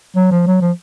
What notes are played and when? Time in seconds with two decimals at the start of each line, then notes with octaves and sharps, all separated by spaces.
0.16 F#3
0.31 F3
0.47 F#3
0.61 F3